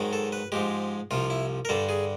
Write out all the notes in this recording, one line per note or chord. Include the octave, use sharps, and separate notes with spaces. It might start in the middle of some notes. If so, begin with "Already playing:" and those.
Already playing: G#2 D#3 F#3
A4
B4
G#2 F3 G#3 G4
C2 C3 F3 F4
E4
A#4
G2 D3 G3 A4
G#4